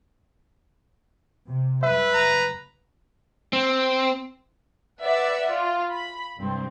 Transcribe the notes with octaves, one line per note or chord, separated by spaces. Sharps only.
C3
F#2 G3 B4 E5 E6
F#1 A#5
C4
B4 D5 E5 F#5
F4
B5
C2 G2 C4